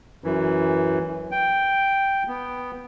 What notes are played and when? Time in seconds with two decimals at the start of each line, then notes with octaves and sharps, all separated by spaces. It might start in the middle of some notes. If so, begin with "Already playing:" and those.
0.24 F#2 E3
1.31 G5
2.28 B3